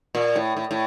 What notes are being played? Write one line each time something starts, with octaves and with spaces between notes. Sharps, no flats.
A#2
A2
A2
A2